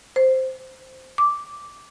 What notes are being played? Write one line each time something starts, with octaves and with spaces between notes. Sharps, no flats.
C5
D6